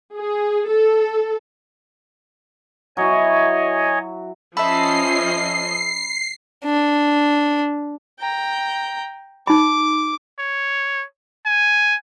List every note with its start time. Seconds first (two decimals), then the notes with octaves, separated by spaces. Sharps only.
0.15 G#4
0.68 A4
2.97 F#3 E4 C#5 D#5 G#5
4.57 F3 C#4 A4 D#5 E5 B5 C7
6.64 D4
8.20 G5 A#5
9.47 D#4 B5 D6
10.39 C#5
11.46 G#5